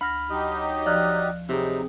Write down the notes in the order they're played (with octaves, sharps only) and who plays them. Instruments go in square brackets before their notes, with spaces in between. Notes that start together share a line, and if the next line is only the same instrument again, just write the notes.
[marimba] D2 A#6 [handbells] B5 F6
[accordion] F#3 D#4 G4 [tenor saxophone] D#5
[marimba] F3 [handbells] D5 F6 F#6
[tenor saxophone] C3 [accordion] F#3 G3 D#4 [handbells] C4 G#4